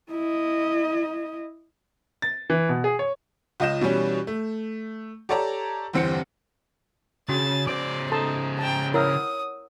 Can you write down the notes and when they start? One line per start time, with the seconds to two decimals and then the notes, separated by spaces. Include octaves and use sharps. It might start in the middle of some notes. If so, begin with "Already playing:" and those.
0.11 E4 D#5
2.22 A6
2.50 E3
2.69 B2
2.84 G#4
2.99 C#5
3.60 C#2 F4 D#5 G6 E7
3.81 B2 E3 G3 C#4
4.27 A3
5.29 G4 A4 C#5 D5 A5 A#5
5.93 G1 E2 C4 G4 C#7
7.29 C#3 C#4 F#4 A6
7.67 C#3 C5 D5 D6
8.12 D#4 A4 A5 C6
8.59 G5 A5 A#5
8.94 E4 A#4 C#5 F#5 D#6 E6